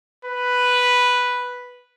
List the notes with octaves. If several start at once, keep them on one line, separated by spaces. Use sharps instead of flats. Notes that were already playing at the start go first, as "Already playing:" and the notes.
B4